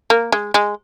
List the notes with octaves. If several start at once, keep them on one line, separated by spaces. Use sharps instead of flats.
A#3
G#3
G#3